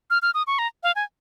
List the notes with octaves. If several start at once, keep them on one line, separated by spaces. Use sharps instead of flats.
F6
F6
D#6
C#6
A#5
F5
G#5